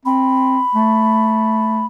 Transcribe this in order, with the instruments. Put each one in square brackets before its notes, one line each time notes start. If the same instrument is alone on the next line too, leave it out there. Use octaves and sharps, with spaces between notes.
[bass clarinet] C4 [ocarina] B5
[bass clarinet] A3